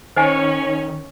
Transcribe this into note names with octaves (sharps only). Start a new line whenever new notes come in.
D#3 C#4 C5 C#5 D#5 G#5